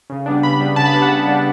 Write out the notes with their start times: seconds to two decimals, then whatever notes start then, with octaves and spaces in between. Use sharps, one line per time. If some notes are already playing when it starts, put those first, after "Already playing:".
0.10 C#3
0.26 G3 B3 D4
0.43 C#3 B5
0.60 G3 B3 D4
0.76 C#3 A5
0.85 B5
0.93 G3 B3 D4 A5
1.02 F#5
1.10 C#3
1.27 G3 B3 D4